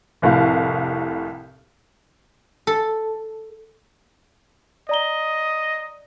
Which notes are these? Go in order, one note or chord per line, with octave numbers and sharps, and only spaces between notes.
F1 C2 A2 F5
A4
D5 D#5 A#5 G7